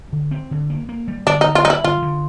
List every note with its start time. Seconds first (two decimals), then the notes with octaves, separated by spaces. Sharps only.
0.13 D3
0.31 C4
0.51 D3
0.70 A#3
0.89 A#3
1.08 G3
1.27 D3 D4
1.41 D3 D#4
1.55 F4
1.65 G3 D#4
1.70 E4
1.84 D3 F4
2.02 D3